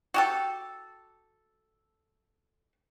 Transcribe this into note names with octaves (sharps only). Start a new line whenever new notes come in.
F#4 G4 A4